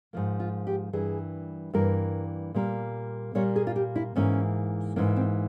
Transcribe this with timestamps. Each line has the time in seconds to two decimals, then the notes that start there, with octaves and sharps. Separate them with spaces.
0.13 G#2 F3 A#3
0.40 F4
0.67 G4
0.93 G2 E3 A#3 G#4
1.73 G2 E3 A#3 A#4
2.54 A#2 G3 A#3
3.35 A#2 G3 A#3 C#5
3.56 G#4
3.67 F4
3.76 G4
3.96 E4
4.16 G#2 E3 A#3 C#4
4.96 G#2 E3 A#3 C#4
5.16 C4